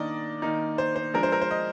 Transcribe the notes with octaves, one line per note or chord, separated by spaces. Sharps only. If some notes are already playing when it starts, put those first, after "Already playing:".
Already playing: D#3 A#3 D4 D5 D#5
D#3 A#3 D#4
C5
C5
F3 G#3 D4 A#4
C5
A#4
C5
D#5